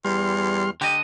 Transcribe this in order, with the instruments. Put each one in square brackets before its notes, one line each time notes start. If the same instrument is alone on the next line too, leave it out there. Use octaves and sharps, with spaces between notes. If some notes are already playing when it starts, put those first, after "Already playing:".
[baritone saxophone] E2 [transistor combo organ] G3 C6 F6
[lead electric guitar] D3 D#5 [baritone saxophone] G4